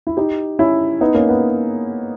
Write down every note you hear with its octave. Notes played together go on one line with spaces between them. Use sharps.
E4
D#4 G4
C#4 E4
B3 D#4
A#3 C#4
B3